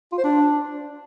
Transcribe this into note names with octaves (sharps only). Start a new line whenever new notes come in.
F4
C5
D4